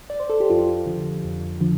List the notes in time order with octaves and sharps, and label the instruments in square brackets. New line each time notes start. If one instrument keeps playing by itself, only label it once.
[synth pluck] D5
C5
A4
G4
F2 F4
D3 F3
F2
D3 F3